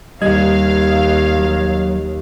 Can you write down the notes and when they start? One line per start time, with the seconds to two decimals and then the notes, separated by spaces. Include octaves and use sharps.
0.22 D#2 G3 D#5 F5 G#6
1.37 F#3